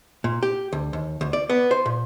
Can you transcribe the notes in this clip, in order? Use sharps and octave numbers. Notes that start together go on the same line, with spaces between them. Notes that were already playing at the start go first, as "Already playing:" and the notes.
A#2
G4
D2
D#2
D2
D5
B3
C5
A#2